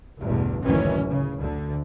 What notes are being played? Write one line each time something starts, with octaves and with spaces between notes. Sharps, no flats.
A1 E2 G2 B2 D3
F#1 D2 D#3 E3 F#3 C#4
C#3
D2 D3